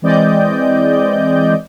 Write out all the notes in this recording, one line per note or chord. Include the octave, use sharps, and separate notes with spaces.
E3 G#3 C4 D5 D#5 G6